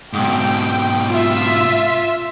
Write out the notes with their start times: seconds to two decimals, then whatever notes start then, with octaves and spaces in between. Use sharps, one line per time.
0.13 G#2 B2 G5
1.10 F4 E5